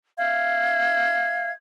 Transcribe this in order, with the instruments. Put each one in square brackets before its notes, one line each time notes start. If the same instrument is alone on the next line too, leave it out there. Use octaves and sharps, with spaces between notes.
[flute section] E5 F5 G#6